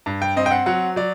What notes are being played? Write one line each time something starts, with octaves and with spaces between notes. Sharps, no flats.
G2
G5
C4 D#5
G5
F#5
F#3 F#5
F#3 D5